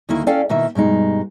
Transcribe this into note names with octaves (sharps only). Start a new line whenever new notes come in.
D2 D#3 A#3 E4
C#4 A4 D5 F5 G5
B2 D#3 A#3 E4 E5
G2 B2 G#3 D#4